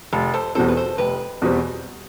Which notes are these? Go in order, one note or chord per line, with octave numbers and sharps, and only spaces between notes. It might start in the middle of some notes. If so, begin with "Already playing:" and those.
F1 F4 A4
A4 C5
E2 B2 G3 C4 A4 C5
B4
A4 C5
F1 G4 B4
E2 B2 G3 C4